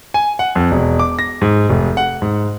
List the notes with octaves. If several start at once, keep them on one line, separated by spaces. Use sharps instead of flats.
G#5
F#5
F2
E1
D6
A#6
G#2
F1
F#5
G#2